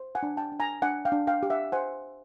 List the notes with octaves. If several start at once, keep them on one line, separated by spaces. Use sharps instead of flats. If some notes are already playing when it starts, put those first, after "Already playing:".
Already playing: C5
F#5 G#5
D4
G5 A5
D4
G#5 A#5
D4 F#5 G#5
F5 G5
D4
F5 G5
G4
E5 F#5
C5 F#5 G#5